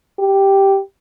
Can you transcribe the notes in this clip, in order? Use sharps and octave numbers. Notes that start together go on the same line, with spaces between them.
G4